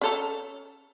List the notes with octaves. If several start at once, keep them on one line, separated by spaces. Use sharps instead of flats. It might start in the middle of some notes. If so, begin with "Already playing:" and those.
C#4 A4 A#5